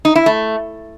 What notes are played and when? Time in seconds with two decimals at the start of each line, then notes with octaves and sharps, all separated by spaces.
0.05 D#4
0.15 E4
0.26 A3